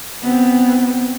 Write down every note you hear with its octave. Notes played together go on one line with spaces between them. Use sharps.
B3 C4